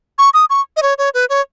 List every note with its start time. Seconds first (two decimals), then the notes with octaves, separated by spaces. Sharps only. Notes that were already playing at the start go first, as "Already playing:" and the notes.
0.18 C#6
0.34 D#6
0.50 C#6
0.77 D#5
0.82 C#5
0.98 C#5
1.14 B4
1.29 C#5